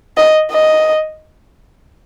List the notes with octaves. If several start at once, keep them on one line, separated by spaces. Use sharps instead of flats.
D#5
D#5